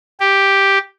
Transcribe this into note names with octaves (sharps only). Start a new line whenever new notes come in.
G4